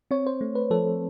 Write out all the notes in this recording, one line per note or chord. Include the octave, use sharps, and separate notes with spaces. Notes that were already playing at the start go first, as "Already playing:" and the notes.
C4 C#5
C5
A3
B4
F3 A4